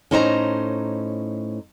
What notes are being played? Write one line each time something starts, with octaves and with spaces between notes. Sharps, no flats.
A2 C#4 D#4 C5 D#5 A#5